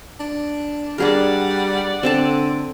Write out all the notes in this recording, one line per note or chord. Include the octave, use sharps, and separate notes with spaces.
D4
G3 D4 G#4 A#4 D5 F#5
D3 C4 A4 A5